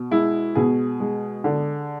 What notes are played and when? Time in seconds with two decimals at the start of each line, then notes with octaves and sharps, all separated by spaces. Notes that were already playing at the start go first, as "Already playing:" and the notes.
Already playing: B2
0.11 G#3 E4
0.55 B2 G#4
1.00 G#3
1.44 D3